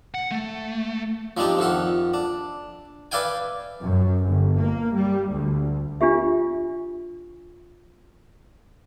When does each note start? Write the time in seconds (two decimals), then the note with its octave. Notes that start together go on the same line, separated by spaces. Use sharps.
0.14 F#5
0.31 A3
1.37 F3 C4 D4 D#4 G4
1.59 F2 D#3 E5 F#5
2.14 D4
3.12 B4 D5 E5 F5 G5 G#5
3.83 F#2
4.27 G1
4.60 A#3
4.96 G3
5.31 D2
6.01 D4 F4 G4 E5